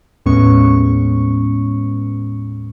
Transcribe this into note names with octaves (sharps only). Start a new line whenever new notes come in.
D#2 A2 G#3 B3 C#4 C#6